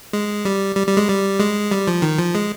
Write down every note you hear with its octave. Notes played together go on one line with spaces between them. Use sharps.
G#3
G3
G3
G3
G#3
G3
G#3
G3
F3
D#3
F3
G#3